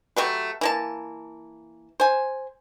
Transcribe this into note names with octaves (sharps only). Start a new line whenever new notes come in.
F#3 A3 G4 B4
E3 A#3 A5
C5 G#5